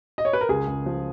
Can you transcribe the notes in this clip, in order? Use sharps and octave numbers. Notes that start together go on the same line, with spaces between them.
D#5
C#5
B4
A#4
C#2 G#4
C#2
F3